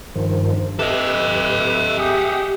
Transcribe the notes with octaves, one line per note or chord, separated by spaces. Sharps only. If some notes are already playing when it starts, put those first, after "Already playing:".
G2 D#3 F3
G4 A4 B4 D#5 E5
G4 G#4 E5 F#5 D#6